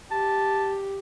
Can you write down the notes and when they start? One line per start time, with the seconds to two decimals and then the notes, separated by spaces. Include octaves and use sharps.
0.11 G4 A5